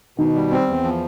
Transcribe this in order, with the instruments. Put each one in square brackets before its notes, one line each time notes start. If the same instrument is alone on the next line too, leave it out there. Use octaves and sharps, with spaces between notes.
[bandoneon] B2 [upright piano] D#3
[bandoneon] G3
C4
E2
F3